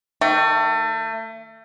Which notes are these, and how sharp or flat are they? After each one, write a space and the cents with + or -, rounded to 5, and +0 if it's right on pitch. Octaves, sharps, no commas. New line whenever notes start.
D#3 -5 A3 +30